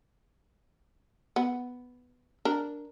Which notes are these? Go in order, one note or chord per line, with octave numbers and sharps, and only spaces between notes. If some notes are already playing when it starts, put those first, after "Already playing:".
B3
D4 A#4